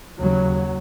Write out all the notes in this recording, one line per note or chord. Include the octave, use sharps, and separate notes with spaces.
D#2 C#3 F#3